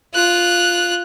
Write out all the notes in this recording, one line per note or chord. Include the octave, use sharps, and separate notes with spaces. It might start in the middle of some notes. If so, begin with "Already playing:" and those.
F4 F#6